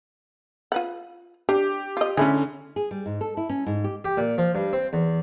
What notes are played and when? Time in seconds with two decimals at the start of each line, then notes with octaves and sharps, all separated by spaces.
0.72 F4 B4 F#5
1.49 D4 G4
1.97 F4 D#5
2.17 D3 A3 C#4 E4 G#4
2.76 G#4
2.91 G3
3.06 G#2
3.21 A4
3.37 E4
3.49 C#4
3.66 G#2
3.84 G4
4.05 G4
4.17 A#2
4.38 F3
4.55 G2
4.73 C4
4.93 E2